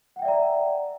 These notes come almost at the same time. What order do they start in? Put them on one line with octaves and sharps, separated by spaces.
F#5 G5 E5 D5 A#5